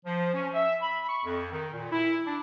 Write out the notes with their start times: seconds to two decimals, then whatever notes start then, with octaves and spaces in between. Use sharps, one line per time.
0.05 F3
0.33 C#4
0.54 E5
0.81 B5
1.08 C#6
1.24 F2
1.51 D#3
1.73 A#2
1.91 E4
2.26 D4